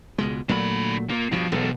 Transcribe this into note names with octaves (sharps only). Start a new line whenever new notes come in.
C#2 B2 G#3
A#2 D3 F#3 A3 B5
A#2 A#3
G2 B2 F3
E1 B1 E2 B2 A4